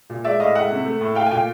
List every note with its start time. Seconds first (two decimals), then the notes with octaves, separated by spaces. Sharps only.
0.10 A#2
0.24 G#3 D5 E5
0.39 A2 D#5 F5
0.55 G#3 E5 F#5
0.70 C3
0.85 A3
1.01 A2
1.15 A3 F5 G5
1.26 G#5
1.31 A#2 F5 G5